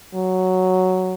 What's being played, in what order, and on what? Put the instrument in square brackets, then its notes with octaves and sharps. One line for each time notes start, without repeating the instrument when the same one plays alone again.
[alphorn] F#3